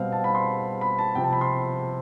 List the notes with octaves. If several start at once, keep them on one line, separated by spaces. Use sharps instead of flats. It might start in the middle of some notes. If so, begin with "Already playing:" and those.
Already playing: B2 G3 C4 F5
A5
B5
C6
B5
A5
C3 F3 C4 G5
A5
B5
C6